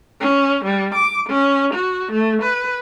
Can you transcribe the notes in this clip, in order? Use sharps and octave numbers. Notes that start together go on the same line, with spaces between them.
C#4
G3
D6
C#4
F#4
A3
B4